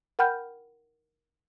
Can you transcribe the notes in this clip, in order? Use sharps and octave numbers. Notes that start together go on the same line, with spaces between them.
A#4 F#5 G5 B5 F6 G6